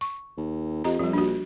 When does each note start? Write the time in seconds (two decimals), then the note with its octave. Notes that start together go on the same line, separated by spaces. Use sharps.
0.01 C#6
0.37 D#2
0.84 F2 G4 D#5 A#5
0.99 F2 F3 G3
1.13 A#1 D4 F#4